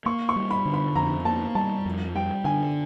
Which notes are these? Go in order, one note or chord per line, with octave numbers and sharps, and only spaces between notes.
A#3 C#6
C#6
G3
B5
D3
B5
F2 A#5
A#3 A5
G3 A5
F2
G3 G5
D3 G#5